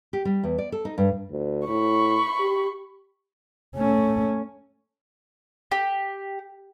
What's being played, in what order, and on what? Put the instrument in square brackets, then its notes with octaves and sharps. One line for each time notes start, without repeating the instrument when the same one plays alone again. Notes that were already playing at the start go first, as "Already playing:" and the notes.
[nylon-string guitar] G4
G3
E2
D5
A4
D#4
G2
[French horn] D2
[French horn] A2 [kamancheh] B5 C#6
[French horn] G4
[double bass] A3 C#4
[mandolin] G4